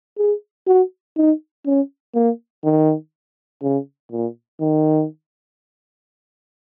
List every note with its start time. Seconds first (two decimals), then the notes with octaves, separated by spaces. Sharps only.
0.18 G#4
0.67 F#4
1.17 D#4
1.66 C#4
2.15 A#3
2.64 D#3
3.62 C#3
4.12 A#2
4.61 D#3